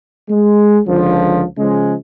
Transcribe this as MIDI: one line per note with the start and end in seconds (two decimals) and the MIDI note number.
0.29 0.78 56
0.87 1.43 37
0.87 1.43 50
0.87 1.43 53
1.58 1.95 49
1.58 1.95 53
1.58 1.95 56